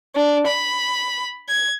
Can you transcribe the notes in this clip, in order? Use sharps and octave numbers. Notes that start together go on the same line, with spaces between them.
D4
B5
G#6